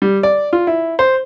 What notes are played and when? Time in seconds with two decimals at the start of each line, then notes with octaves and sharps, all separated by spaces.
0.02 G3
0.23 D5
0.53 F4
0.67 E4
0.99 C5